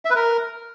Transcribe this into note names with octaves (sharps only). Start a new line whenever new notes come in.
E5
B4
A#4